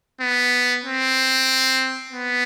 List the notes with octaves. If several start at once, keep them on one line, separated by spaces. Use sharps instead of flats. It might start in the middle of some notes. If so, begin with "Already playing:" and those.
B3
C4
B3